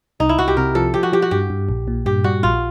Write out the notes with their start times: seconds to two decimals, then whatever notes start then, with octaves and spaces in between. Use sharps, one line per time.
0.20 C2 D#4
0.29 E4
0.39 C2 F#4
0.48 G4
0.57 C3 A#4
0.75 F3 A4
0.94 F3 G4
1.03 F#4
1.13 F3 G4
1.22 F#4
1.31 G2 G4
1.50 G2
1.69 A#1
1.88 A#2
2.06 G2 G4
2.24 G3 F#4
2.43 A#1 F4